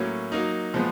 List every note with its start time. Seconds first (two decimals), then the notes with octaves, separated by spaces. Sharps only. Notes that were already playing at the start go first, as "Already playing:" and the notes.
Already playing: A2 F#3 A#3 C#4
0.32 F#3 A#3 D#4
0.74 A#2 F3 G#3 B3